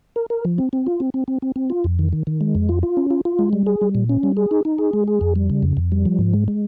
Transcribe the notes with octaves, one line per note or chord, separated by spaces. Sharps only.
A#4
A#4
F3
C4
C4
F4
C4
C4
C4
C4
C4
F4
F2
D#3
D#3
D#3
G#3
F2
F4
F4
C#4
F4
F4
G#3
G3
G#4
G3
A#2
C#4
G3
G#4
D#4
D#4
G#4
G#3
G#4
F2
G3
C#3
F2
F2
G3
F3
G#2
G#3
G#3